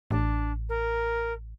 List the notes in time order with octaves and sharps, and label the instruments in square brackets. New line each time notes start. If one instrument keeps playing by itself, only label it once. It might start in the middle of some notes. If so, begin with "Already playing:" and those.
[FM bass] A1 [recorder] D4
[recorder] A#4